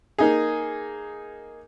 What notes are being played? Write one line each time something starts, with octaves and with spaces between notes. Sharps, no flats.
A#3 D#4 G#4